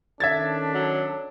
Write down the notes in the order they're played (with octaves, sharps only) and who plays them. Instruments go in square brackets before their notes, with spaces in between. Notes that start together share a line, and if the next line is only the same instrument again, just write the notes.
[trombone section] D#3 C#4 A4 [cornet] D4 [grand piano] E5 G#6 A6
[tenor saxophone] F#3